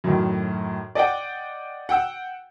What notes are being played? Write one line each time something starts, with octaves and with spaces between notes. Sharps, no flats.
F#2 A2 D#3
D5 D#5 F#5 G5
F#5 G5 E6